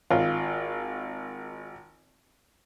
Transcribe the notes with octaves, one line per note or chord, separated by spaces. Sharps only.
G#1 F4